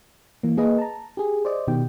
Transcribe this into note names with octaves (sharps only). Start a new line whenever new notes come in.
E3 A#3
A#3 G#4 A#4 B4 D#5
A5 A#5
G4 G#4
C5 D5 D#5
B2 D#3 G4 G5